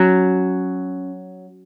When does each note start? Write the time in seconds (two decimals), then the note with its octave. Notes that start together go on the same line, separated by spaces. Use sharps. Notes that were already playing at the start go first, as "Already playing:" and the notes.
Already playing: F#3 C#4